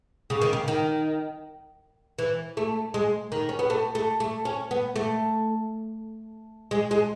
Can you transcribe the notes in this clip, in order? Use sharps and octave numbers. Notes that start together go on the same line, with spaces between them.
C#3
D#3
C#3
D#3
E3
A3
G#3
D#3
C#4
B3
A3
A3
A3
C#4
B3
A3
G#3
G#3